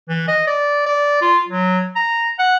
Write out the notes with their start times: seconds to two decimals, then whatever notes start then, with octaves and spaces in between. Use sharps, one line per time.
0.09 E3
0.28 D#5
0.47 D5
0.86 D5
1.21 F4
1.48 F#3
1.95 A#5
2.39 F#5